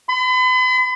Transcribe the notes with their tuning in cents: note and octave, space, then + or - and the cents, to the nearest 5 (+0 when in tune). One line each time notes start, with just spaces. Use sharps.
B5 +40